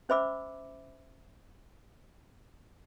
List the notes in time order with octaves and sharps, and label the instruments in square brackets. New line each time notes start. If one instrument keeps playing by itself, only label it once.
[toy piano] C#4 C5 E5 B5 D6 E6